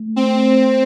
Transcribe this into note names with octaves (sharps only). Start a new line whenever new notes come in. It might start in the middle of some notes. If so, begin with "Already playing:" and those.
Already playing: A3
C4